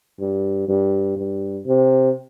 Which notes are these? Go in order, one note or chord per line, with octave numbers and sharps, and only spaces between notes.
G2
G2
G2
C3